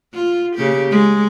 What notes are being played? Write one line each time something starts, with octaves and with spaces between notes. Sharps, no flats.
F4
C#3 A#3 G4
G#3